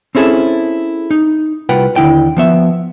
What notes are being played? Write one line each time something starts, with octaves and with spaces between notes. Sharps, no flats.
C4 C#4 E4 G#4 A4
D#4
C2 F4 B4 F#5 G5
D#2 D3 A#3 E4 G5
F3 B3 E5